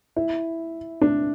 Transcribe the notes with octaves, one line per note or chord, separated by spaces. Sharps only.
E4
D4